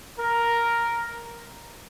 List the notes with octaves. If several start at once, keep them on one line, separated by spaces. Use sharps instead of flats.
A#4